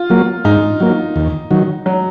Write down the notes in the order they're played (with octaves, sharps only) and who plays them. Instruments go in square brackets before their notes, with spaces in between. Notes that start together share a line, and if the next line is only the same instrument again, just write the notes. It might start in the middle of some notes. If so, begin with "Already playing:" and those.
Already playing: [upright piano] F4
[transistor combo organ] F#3 A#3
[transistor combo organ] G#2 [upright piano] D#4
[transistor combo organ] F#3 A#3
D#2
D#3 F#3
[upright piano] F#3